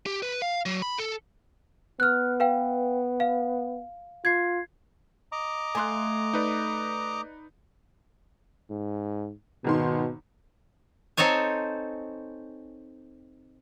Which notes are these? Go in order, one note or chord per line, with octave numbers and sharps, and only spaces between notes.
G4
B4
F5
F#3
B5
A4
B3 F6 F#6
B4 F5 G5
F5
F4 G#6 C7
D#5 A#5 D6
A3 F5 G#5 C6 F#6
D#4 B4 D5
G#2
G#1 B2 D#3 C6
C4 D#4 A4 C#5 G#5